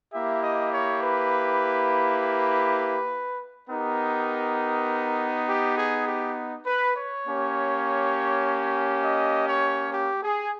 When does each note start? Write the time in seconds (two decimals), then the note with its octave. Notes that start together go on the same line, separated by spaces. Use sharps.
0.13 A#3 E4 G4 E5
0.43 D#5
0.73 C#5
1.02 B4
3.69 B3 D#4 G4 A#4
5.48 G4
5.77 G#4
6.07 G4
6.66 B4
6.96 C#5
7.25 A#3 C#4 G4
9.04 D#5
9.49 C#5
9.94 G4
10.23 G#4